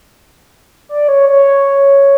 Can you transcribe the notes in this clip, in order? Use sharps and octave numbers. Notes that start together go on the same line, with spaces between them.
D5
C#5
C#5